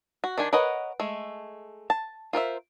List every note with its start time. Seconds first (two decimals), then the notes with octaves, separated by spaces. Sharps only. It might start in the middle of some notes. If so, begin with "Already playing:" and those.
0.24 F#4
0.38 D#3 D4 G4 G#5
0.53 A#4 B4 C#5 D#5 F#5
1.00 G#3 A3
1.90 A5
2.33 F4 A#4 C5 E5